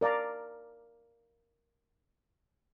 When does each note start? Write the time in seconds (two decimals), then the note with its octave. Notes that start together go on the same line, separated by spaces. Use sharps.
0.01 A#4 D5 F5 A#5 D6